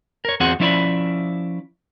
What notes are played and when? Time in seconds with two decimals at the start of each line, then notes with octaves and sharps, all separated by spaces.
0.25 A#4 C#5
0.40 E2 C4 F4 F#4 G#4 F#5
0.60 F3 C#4 E4 D5 E5 B5